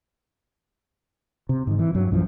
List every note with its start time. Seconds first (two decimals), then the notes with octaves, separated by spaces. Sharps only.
1.49 C3
1.67 G#2 D#3
1.79 E3
1.94 G2 F#3
2.11 A#1 F#2 E3 F3